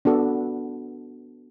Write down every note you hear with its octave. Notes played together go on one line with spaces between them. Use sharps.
B3 D4 F#4 A4